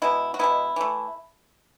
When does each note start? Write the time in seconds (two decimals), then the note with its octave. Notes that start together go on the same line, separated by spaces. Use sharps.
0.02 B2 G#3 B3 E4
0.34 F#4
0.39 B2 G#3 B3 E4
0.76 E3 A3